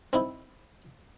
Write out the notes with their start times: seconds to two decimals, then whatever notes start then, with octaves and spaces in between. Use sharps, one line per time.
0.13 C4 D#4 E4